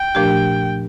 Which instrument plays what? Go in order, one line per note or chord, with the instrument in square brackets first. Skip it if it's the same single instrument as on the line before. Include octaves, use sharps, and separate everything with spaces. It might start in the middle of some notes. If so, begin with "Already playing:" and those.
Already playing: [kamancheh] G5
[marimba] A#2 F3 A3 D4 G4